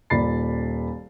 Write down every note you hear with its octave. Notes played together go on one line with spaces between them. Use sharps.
D#1 A#2 D5 B5 A6 C7